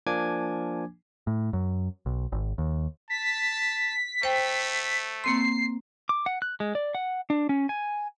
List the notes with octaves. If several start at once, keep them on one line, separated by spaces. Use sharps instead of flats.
F3 A#3 D4 G#5 D6 G#6
A2
F#2
B1
G#1
D#2
A5 B6
A3 C5 G5
A#3 C4 C6 C7
D6
F#5
F#6
G#3
D5
F#5
D4
C#4
G#5